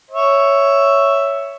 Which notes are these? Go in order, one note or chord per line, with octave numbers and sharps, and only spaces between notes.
C#5 E5